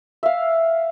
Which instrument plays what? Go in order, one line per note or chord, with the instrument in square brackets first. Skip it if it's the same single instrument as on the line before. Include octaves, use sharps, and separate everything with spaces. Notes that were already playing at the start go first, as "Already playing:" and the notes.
[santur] E5 F5